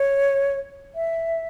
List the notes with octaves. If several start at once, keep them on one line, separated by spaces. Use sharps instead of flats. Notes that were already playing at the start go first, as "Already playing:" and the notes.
Already playing: C#5
E5